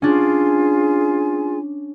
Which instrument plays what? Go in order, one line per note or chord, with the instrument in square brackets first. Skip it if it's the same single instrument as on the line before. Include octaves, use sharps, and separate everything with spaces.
[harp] C#4 D4 [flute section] F4 G#4 G#5